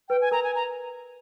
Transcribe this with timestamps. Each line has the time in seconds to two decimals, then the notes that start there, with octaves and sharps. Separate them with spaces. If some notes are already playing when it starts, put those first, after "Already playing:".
0.09 B4 G5
0.21 G#5
0.32 A#4 A#5
0.43 G#5
0.55 A#5